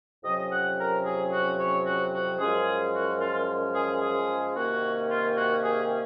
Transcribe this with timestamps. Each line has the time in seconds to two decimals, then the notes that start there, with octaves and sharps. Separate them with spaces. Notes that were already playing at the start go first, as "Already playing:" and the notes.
0.24 F2 C3 F#3 C#4 D#5
0.51 F#5
0.78 A#4
1.05 G#4
1.31 F#4
1.59 C#5
1.86 F#4
2.13 F#4
2.39 F#2 F3 G#3 C#4 G#4
2.94 F#4
3.21 F4
3.75 G#4
4.01 G#4
4.55 C3 D#3 A#3 C#4 F#4
5.10 F4
5.37 F#4
5.64 G#4